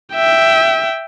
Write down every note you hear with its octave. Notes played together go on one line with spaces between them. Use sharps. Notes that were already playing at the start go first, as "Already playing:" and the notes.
E5 G5